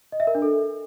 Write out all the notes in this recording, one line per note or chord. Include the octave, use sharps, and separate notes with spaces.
D#5
E5
A#4
D4
A4